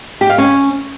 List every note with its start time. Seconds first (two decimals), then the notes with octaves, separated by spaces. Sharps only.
0.21 G4
0.30 F5
0.38 C#4